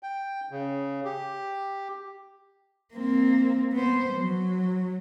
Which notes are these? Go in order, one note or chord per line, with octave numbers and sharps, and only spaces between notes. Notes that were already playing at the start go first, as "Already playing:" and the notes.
G5
C#3
G4
A#3 C4
B3 C5
F#3